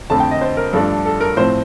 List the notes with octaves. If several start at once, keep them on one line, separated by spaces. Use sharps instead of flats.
F2 D3 A3 C4 A5
G5
D#5
C5
A#4
G2 F3 A3 D4 A4
A4
A#4
A2 F3 C4 C5